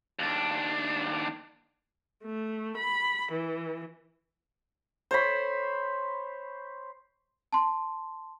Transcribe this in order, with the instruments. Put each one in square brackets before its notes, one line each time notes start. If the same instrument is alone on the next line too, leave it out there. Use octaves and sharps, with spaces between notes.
[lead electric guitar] D#2 D4
[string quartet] A3
B5
E3
[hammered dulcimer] C5 C#5 B5
[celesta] A5 C6